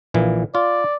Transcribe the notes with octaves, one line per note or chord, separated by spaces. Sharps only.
A#1 A#2 E3
F4 D5